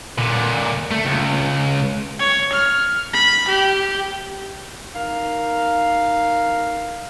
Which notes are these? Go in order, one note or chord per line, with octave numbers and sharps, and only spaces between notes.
A#2 D3
A3
C#2
C#5
F6
B5
G4
D#4 A#4 F5